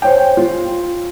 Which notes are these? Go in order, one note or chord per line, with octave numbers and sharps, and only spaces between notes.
C5 C#5 G5
F4